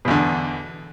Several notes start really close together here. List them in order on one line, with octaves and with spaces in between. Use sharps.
B2 E2 D3